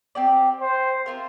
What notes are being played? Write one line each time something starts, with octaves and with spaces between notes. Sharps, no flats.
C4 G4 D5
C5
C4 F4 A#4